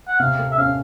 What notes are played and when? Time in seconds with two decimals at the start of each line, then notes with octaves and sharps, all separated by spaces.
0.08 F#5
0.19 C3 F5
0.39 A3
0.52 E5
0.58 C#4 F5